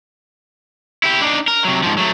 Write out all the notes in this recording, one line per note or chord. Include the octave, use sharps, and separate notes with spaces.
E4 G4
D4 D#4
A#4
C3 F#3
G#2 F3
F#3 A3